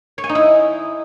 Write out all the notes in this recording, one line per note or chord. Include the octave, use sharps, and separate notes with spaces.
C#5
G#5
D#4
E4